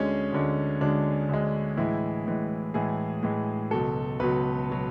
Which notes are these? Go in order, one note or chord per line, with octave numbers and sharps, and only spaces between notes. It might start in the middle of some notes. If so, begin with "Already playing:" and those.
Already playing: D2 D3 G#3 C#4
D2 D3 G#3
D2 D3 G#3 D4
D2 D3 G#3
A2 E3 G#3 E4
A2 E3 G#3
A2 E3 G#3 G#4
A2 E3 G#3
C#2 B2 F#3 A4
C#2 B2 F#3 B4
B2 F#3